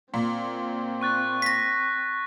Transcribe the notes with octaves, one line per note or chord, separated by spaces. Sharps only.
A#2 C4
C#6 F#6 A6
A#6 B6